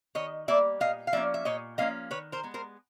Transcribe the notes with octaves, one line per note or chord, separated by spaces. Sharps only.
D#3 C#5 D#5
G3 A#3 D5 E5
A#2 D#5 F5
F5
F3 A#3 C#4 D5 E5
E5
A#2 C#5 D#5
F3 A#3 C#4 D#5 F5
D#3 B4 C#5
A#4 C5
G#3 B3
A#4 C5